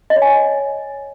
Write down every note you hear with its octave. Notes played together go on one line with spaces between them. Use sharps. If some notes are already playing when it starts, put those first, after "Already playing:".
D#5
C#5
G#5